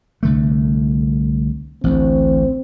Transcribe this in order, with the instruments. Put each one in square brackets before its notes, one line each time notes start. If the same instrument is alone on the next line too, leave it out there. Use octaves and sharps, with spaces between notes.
[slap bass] C2 D3 A3
[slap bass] A1 D2 [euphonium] C4